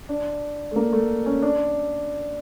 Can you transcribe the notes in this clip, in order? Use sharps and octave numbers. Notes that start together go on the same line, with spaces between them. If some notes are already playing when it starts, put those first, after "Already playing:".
D4
A3
A#3
A3
C#4
D4